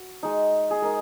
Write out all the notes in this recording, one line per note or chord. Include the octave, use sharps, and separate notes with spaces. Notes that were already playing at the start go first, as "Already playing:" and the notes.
Already playing: F#4
G#3 D#4
G#4
G#3 D#4 A#4